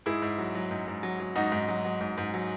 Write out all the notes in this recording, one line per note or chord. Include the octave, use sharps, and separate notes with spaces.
G#2 E4 G#4
G#2
F#3
F#3
G#2
G#2
F#3
F#3
G#2 D#4 F#4
G#2
F#3
F#3
G#2
G#2
F#3